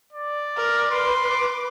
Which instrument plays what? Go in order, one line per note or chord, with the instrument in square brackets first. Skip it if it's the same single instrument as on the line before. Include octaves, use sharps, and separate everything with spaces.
[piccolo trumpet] D5
[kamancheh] A#4
[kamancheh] B4 D6 [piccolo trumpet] C6